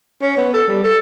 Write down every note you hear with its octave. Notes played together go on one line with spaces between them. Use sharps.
C#4
B3
A4
G3
A4